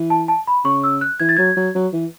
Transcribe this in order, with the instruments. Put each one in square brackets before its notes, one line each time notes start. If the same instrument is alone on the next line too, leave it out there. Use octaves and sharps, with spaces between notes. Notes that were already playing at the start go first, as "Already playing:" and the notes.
Already playing: [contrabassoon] E3
[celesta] A5
A5
B5
[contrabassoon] C#3 [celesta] C#6
[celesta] E6
F#6
[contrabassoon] E3 [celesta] G#6
[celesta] A6
[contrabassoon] F#3 [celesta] G#6
[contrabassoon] F#3
F#3
E3